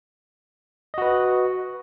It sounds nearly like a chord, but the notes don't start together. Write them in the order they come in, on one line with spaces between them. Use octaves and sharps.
D#5 F#4 B4